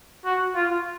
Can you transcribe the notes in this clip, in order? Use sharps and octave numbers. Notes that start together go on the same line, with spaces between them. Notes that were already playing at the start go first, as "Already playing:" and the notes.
F#4
F4